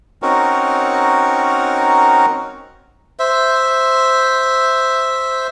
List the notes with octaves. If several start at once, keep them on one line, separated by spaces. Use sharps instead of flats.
C4 C#4 D#4 F#4 A#4
C5 E5